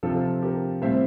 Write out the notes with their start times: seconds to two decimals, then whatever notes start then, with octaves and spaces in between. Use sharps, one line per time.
0.03 C3 F3 C4 F4 A4
0.42 G4 A#4
0.82 A2 G3 C4 C5 E5